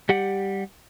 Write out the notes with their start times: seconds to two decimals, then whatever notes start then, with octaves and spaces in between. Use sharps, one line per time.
0.09 G3 G4 F#5